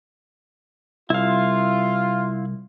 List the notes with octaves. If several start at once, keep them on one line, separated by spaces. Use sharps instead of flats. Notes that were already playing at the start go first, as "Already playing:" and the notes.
C2 E4 F4 F5